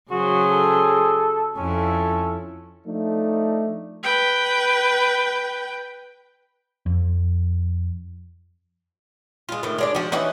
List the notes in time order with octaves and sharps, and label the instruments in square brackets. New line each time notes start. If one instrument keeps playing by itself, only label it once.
[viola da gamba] C#3 F#3 C5 [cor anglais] F#4 [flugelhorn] G#4
[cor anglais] A4
[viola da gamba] F2 E4 [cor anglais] C#4 [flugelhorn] A4
[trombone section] F3 A3 D4 D#4
[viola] B4 G5
[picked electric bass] F2
[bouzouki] G#3 F4
A2 D#3
G#3 D4 D5
F3 F#4
E3 C#4 D#4 F#5